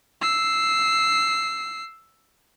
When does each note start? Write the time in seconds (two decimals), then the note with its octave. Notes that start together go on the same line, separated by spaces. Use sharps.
0.21 E6 C7